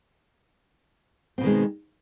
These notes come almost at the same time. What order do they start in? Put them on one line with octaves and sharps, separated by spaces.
C4 B2 D#3 G#3